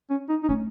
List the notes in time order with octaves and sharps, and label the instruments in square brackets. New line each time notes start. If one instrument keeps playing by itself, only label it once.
[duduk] C#4
D#4
D#4
[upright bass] A3 [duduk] C#4